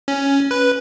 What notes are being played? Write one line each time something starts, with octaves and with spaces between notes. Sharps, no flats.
C#4
B4